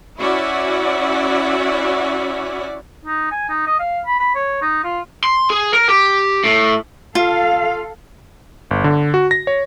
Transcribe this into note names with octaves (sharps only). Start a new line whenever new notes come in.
C#4 E4 F#4 D5 E5 F#5
D#4
G#5
D#4
D#5
F5
B5
B5
C#5
D#4
F4
C6
G#4
A#4
G4
A2
F4 A4 F5
G1
D3
F#4
A#6
C#5